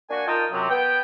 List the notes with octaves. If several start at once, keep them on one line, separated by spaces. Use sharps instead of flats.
A#3 D4 F#4 G#5
D#4 F4 A#4 D#5 G5 A5
F#2 C3 F#3
B3 G5